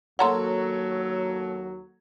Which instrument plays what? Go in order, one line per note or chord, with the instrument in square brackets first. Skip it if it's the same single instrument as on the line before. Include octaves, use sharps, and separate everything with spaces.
[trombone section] D#2 F#3 [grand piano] A#3 A4 C#5 [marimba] F#5 A#5 C6